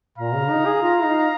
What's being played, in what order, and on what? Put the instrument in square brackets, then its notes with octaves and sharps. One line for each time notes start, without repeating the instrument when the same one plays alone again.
[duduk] A#2 [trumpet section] F5 A#5
[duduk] C#3
D#4
G#4
F4
D#4